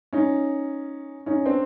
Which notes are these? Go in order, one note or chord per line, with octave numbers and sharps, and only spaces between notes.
C#4 D#4
C#4 D#4
C4 D4